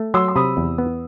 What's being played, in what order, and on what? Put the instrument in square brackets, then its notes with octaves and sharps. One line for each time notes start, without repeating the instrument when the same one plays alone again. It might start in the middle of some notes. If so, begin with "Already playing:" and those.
Already playing: [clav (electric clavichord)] A3
[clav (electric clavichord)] F#3 [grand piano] C6 E6
[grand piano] C6
[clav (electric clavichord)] C3 [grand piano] B5 D#6
[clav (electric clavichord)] E2
B3